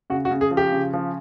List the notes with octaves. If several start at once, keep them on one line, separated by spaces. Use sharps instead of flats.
C#3 F#4
F#4
C#3
G#4
F3
G4
C#3
F3